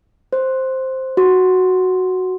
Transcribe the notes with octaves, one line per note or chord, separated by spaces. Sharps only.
C5
F#4